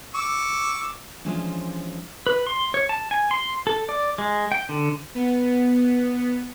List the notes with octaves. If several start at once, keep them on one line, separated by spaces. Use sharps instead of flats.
C#6 D6 E6
E3 F3 G#3 C#4 D4
B4
C6
C#5
A5
G#5
C6
A4
D5
G#3
G5
D3
B3